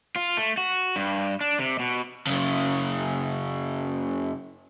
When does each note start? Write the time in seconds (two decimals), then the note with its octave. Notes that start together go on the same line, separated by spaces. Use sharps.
0.16 F4
0.37 A3
0.57 F#4
0.96 G2
1.41 D4
1.59 C3
1.79 B2
2.27 F#2 C#3